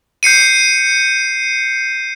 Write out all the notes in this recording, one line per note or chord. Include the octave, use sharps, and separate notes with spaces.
G6 C7 C#7 D#7